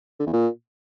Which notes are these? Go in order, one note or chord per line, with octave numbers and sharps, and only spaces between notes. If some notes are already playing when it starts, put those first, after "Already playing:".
D3
E2
A#2